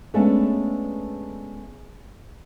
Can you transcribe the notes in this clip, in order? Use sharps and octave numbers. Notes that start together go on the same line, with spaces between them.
G#3 A3 B3 C#4 D4 E4